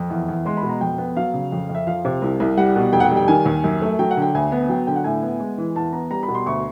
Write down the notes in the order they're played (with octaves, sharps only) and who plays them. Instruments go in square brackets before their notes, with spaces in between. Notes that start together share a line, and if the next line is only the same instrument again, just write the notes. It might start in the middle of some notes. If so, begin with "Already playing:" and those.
Already playing: [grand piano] F2
E2
E2
G#3 C6
B5
B2
A#5
F2 G5
B3
F#3 F5
C#3
F2
F2
E5
F3 F5
C3
C2
C2
G3 F#5
B2
F1 G5
F#5
G5
G3
G5
D#3 G#5
D#2
F#2
A3
F#3 G5
F#5
D3
G5
D2 G#5
B3
F#3 G5
D3 G5
F#5
A2 G#5
B3
G#3
E3
E2 A5
B3 A#5
G3 A#5
B5
B2
C6
D2 C#6